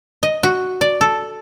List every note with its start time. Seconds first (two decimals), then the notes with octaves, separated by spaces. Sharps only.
0.23 D#5
0.43 F#4
0.81 D5
1.01 A4